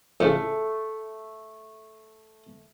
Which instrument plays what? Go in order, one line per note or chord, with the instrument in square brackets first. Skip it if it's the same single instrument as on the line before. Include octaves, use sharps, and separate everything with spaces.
[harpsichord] F2 A2 C#3 [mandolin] A3